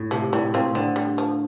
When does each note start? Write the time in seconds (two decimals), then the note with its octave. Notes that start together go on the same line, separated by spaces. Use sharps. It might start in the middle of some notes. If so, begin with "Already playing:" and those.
Already playing: A2
0.11 C3 F3
0.33 A2 G3
0.54 A2 C4 F4
0.75 D3 C4
0.96 G3
1.18 F3